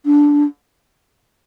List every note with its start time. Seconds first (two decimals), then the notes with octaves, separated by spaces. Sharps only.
0.06 D4